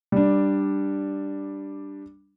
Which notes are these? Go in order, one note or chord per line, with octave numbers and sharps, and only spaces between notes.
G3 D4